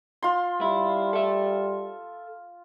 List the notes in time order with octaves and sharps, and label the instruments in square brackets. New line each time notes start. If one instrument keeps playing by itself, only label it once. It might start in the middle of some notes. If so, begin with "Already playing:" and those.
[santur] F4 C6
[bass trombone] G3 [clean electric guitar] E4
[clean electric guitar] A4 E5